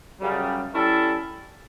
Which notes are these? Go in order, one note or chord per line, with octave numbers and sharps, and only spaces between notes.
F#2 C#3 G3
G3 C#4 E4 A4